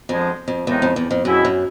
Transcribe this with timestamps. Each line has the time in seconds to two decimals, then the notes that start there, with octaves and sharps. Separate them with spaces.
0.09 F2 D3 F3 G#3
0.48 F2
0.67 E2 A2 F3 G#3 C4 D#4
0.82 F2
0.96 E2
1.11 F2
1.25 F#2 B2 G#3 C4 E4
1.45 F#2